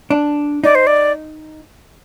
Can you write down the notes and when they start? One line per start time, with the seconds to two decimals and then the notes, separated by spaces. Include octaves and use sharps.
0.10 D4
0.64 D#4 D5
0.75 C5
0.87 D5